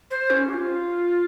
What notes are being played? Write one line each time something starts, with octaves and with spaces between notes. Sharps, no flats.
C5
C#4
G4
F4